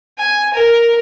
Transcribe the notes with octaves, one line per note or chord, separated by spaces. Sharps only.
G#5
A#4